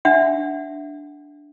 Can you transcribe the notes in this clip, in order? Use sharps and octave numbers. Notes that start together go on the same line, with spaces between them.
D4 E5 F#5